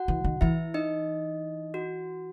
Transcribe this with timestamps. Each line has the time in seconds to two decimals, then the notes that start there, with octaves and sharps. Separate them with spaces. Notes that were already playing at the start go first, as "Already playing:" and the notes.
Already playing: F#4 F#5
0.08 E3
0.24 D#3
0.41 E3 E4 E5
0.74 D#4 D#5
1.74 F#4